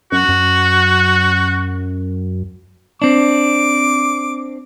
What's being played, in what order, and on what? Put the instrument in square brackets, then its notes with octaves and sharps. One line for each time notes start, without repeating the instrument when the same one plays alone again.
[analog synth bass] F#2 [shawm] F#4
[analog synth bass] F#2
[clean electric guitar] C4 D4 [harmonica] D6